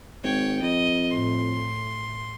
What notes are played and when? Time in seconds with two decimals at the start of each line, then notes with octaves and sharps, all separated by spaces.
0.23 G#1 C#5 G5
0.62 F2 D#5
1.10 A2 C6